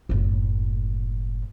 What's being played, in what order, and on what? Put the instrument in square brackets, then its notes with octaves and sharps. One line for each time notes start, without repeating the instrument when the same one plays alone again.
[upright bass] F#1 A2